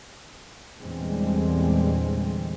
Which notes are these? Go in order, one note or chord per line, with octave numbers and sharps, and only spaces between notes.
E2 A#2 D3 G3 G#3 C4